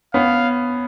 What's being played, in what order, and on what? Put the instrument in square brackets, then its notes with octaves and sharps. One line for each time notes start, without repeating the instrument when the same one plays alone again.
[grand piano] B3 C#4 [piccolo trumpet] F5